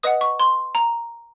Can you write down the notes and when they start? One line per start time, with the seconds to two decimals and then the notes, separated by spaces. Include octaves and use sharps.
0.03 B4 D#5 F#5 D#6
0.21 C#6
0.40 C6
0.75 A#5